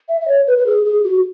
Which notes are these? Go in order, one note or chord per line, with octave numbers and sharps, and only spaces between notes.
E5
E5
C#5
B4
B4
G#4
G#4
F#4